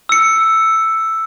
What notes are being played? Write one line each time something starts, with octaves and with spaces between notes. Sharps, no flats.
E6 C#7